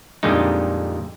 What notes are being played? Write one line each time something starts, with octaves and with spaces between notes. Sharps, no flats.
F2 A#2 D3 G3 G#3 D#4